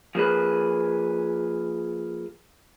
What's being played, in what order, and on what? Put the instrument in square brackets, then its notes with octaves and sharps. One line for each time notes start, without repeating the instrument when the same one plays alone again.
[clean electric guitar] F3 A#3 G#4 B4